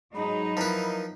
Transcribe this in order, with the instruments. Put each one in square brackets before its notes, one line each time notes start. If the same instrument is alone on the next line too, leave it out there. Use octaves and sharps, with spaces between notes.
[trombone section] G#2 G#3 [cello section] F#3 D#4 [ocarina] B5
[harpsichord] F3 B4 [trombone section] E4 A#4